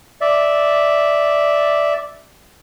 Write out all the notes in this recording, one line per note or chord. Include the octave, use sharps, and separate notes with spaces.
D5 E5